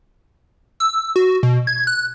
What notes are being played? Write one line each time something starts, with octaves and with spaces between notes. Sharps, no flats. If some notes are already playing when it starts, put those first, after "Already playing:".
E6
F#4
B2
G#6
F#6